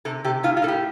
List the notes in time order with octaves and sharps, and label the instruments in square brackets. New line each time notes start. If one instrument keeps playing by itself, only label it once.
[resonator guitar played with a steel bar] C3 A4
C3 G4
A2 F4
F4
A2 A4
G4